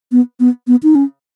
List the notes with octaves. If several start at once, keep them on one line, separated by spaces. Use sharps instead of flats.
B3
B3
B3
D#4
C#4